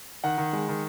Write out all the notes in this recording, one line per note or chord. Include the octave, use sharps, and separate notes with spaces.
D#3 F#5
D#3
G#3
D#3